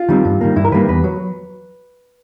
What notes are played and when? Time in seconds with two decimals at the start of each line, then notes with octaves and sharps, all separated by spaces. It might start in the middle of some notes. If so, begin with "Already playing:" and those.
Already playing: F4
0.09 D#3 G3 C4
0.25 G2
0.41 D#3 G3 A#3
0.56 G2 E4
0.65 A#4
0.72 D#3 G3 A#3 B4
0.88 E2 B4
1.04 F#3